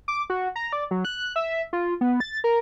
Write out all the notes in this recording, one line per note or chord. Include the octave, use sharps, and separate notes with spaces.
D6
F#4
A#5
D5
F#3
F#6
E5
F4
B3
A6
A#4